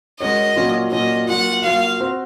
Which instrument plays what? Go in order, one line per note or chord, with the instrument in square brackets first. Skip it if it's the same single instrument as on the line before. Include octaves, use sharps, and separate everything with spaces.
[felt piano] G#3 C#4 F#4 A#4 C#5 [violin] D#5
[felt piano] A#2 F#3 C#4 F4
[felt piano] A#2 F#3 C#4 F4 [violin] D#5
[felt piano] F#3 A#3 F4 [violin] F#5
[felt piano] F#3 A#3 F4 [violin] F5
[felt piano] C4 F#4 C5